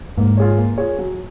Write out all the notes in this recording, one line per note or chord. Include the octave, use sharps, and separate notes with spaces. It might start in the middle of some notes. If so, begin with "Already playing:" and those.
G#2 A#3
F4 G#4 C#5
A#3
F4 G#4 C#5
F#3